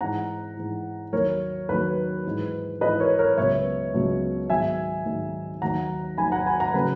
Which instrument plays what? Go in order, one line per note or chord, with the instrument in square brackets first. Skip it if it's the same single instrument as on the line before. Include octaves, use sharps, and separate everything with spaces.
[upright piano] G#2 E3 F#5 A#5
G#2 E3
D#2 D#3 F#3 A#4 C#5
D#2 D#3 F#3 B4
G#2 E3
G#2 E3 B4 D#5
A#4 C#5
A#4 C#5
C#2 B2 F#3 C#5 E5
C#2 B2 F#3
G#2 D#3 F#3 E5 G#5
G#2 D#3 F#3
D#2 D#3 F#3 F#5 A#5
D#2 D#3 F#3 G#5 B5
F#5 A#5
G#5 B5
F#5 A#5
C#3 F#3 B4